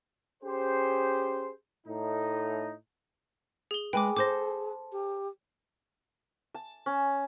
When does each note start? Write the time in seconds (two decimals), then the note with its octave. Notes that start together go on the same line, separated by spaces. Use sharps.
0.42 C#4 G4 G#4 C5
1.87 A2 D#4
3.71 G#4 G7
3.93 G#3 G#4 B4 G5 G#5 D6
4.17 A4 C5 D6 G6 A#6
4.92 G4
6.54 A5
6.86 C#4